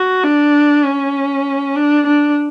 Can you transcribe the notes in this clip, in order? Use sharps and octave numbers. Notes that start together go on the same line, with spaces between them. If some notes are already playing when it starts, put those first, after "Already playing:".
Already playing: F#4
D4
C#4
D4
D4